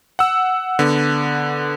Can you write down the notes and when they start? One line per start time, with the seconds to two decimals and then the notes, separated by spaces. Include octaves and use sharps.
0.19 F#5 E6
0.79 D3 B3